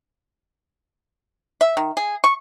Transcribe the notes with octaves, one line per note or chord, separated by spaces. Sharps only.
E5
D#3
G#4
C#6